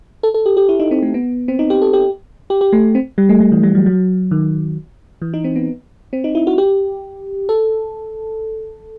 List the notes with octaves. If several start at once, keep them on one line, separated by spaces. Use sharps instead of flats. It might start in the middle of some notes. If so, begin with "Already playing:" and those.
A4
A4
G4
G4
E4
D#4
C4
A3
B3
C4
D#4
G4
A4
G4
G4
G4
A3
C4
G3
A3
G3
E3
G3
F#3
F#3
D#3
E3
D#4
C4
B3
C4
D#4
E4
F#4
G4
A4